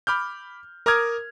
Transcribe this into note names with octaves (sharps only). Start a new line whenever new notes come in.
B5 D6 F6 G6
A#4 A#5 D6 D#6 F6 G#6